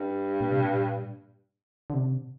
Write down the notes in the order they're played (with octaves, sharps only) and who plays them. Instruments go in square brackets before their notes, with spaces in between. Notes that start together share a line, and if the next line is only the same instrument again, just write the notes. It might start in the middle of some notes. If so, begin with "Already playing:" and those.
Already playing: [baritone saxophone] G2
[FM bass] A#2
C3
A#2
D3
C3